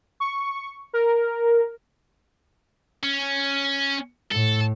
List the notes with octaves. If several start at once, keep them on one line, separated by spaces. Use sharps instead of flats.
C#6
A#4
C#4
A2 A4